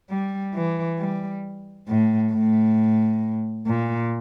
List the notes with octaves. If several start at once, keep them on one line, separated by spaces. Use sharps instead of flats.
G3
E3
G3
A2
A2
A#2